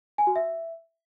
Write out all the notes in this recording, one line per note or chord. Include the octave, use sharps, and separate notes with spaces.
G#5
F#4
E5